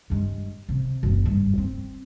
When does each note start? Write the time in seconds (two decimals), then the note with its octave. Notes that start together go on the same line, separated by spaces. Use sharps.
0.10 G2 G#3
0.69 C3
1.03 F#1 B1
1.26 G2
1.58 C4